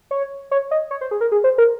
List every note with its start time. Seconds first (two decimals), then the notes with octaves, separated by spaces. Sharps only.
0.11 C#5
0.51 C#5
0.71 D#5
0.91 C#5
1.01 C5
1.11 G#4
1.21 A#4
1.32 G#4
1.44 C5
1.58 A#4